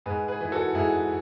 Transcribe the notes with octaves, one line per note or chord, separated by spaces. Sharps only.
G#2 G#4 B4
G#4 B4
E3
F#4 A4
G#2 E4 G#4